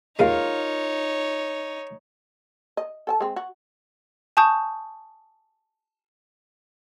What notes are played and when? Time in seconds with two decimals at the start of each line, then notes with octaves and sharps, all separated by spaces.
0.19 D#2 G#3 D#4 F4 A#4 C#5 F5
2.77 D#5
3.07 A4 G5 A5
3.20 G#3 C4
3.36 F#4
4.37 G#5 A5 C#6 D#6 G6